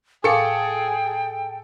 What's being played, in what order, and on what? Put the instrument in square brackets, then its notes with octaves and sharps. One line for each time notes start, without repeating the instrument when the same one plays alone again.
[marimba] A2 F5 D6 [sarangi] G#4 [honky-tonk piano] A4 C#7 [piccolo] G5